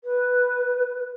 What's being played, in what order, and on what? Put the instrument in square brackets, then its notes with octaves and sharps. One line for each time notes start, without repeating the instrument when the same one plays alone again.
[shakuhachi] B4